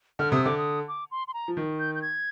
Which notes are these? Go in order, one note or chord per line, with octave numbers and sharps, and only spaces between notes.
D3 F6
C3 D#6
D3 D6
D#6
D6
C6
C6
A#5
F3
D#3
G6
G6
G#6